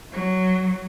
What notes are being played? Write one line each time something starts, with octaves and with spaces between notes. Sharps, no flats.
F#3